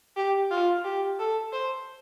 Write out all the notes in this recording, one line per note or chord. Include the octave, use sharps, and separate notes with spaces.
G4
F4
G4
A4
C5